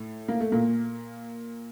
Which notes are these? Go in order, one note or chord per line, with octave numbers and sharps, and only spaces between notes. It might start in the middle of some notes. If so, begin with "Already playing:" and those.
Already playing: A2 A3
A#3
A3
A#2 A#3